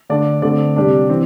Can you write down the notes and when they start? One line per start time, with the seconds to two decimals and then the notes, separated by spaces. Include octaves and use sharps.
0.09 D3 A3 D4 D5
0.42 D3 A3 C4 D5
0.76 C3 G3 D4
1.10 E3 C4